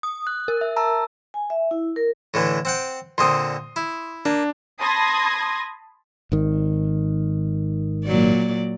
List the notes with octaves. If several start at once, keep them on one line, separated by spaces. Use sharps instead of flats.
D#6
F#6
A#4
E5
A5 A#5 E6
G#5
E5
E4
A#4
A2 D3 E3
C4 F#5 G5
A#2 D3 C4 C6 D#6
E4
A#3 D4
A5 B5 C6 D#6 G#6 A#6
G#1 D#3
A#2 F#3 D5